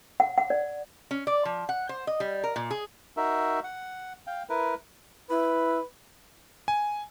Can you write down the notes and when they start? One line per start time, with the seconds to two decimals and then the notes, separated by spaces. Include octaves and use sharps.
0.20 F#5
0.38 F#5
0.50 D5
1.11 C#4
1.27 D5
1.45 F3
1.69 F#5
1.89 C5
2.07 D#5
2.20 G3
2.43 A#4
2.56 A#2
2.71 G#4
3.17 D#4 F#4 A#4 E5
3.64 F#5
4.27 F5 G5
4.49 E4 A#4 B4
5.30 E4 B4
6.68 G#5